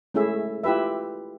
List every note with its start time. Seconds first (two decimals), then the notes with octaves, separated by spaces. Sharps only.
0.14 G#3 A3 C#4 E4 G#4 E5
0.64 E4 F4 G4 B4 E5